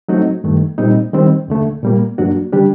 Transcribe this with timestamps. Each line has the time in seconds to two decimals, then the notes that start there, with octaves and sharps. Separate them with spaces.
0.08 F#3 A3 C4 D#4 F#4
0.44 G2 D#3 A3
0.78 A#2 G3 C4 D#4
1.13 D#3 G3 C4
1.48 D#2 D3 A3
1.83 A#2 G3 A#3
2.18 G2 F#3 A#3 D4 F#4
2.53 D3 G3 D4 G4